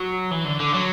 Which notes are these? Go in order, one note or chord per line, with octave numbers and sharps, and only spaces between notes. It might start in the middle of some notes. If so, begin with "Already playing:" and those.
Already playing: F#3
E3
D3
D3
F#3